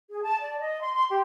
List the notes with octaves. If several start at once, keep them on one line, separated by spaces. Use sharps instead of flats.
G#4
A5
D5
D#5
C6
C6
G4